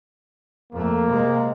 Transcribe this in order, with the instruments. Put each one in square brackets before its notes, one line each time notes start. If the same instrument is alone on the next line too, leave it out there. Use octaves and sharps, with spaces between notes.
[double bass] F2 A3 [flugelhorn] A#3
[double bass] C3 G#3